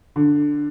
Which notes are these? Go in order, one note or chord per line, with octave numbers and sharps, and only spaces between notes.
D3